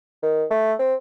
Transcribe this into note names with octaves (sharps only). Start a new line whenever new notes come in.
D#3
A3
C4